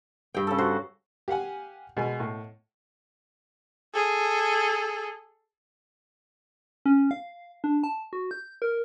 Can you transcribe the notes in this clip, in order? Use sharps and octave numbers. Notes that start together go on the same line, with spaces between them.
G2 G5
C#3 A4
F#4 C5
G4 F5 F#5 G#5
B2 G#3 G#5
A2
G#4 A4
C#4
F5
D4
A5
F#4
G6
A#4